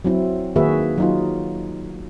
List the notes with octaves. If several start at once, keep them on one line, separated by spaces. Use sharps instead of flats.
F#3 C4 E4
D#3 A#3 F#4 G#4 B4 E5
F#3 D#4 F4